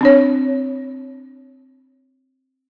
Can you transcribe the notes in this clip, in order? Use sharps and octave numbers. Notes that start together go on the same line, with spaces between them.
C4 D4 C#5